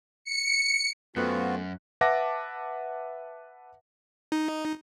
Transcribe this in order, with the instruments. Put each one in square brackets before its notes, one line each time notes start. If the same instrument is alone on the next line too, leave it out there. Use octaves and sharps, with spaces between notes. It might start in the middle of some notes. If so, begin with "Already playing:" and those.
[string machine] C#7
[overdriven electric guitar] F#2 [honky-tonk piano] A3 F#6 [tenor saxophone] B3 [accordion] C4 F4 F#4
[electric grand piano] B4 E5 F#5 A5 D6 A#6
[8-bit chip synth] D#4